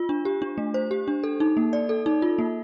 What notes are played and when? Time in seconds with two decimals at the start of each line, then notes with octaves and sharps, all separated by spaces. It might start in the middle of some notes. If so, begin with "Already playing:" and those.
Already playing: F4
0.09 D4
0.25 G4
0.42 D4
0.58 A3
0.74 C5
0.91 G4
1.08 D4
1.24 A4
1.40 D#4
1.57 A#3
1.73 D5
1.89 A4
2.06 D#4
2.22 F4
2.39 A#3